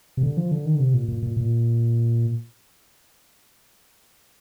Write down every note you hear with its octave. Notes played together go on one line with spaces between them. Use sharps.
C3
D3
F3
D3
D#3
D3
C3
A#2
A#2
A#2
A#2